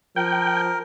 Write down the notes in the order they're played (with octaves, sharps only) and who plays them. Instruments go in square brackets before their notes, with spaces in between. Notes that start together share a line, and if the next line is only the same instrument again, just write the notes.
[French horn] F3 [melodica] A#4 [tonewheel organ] G5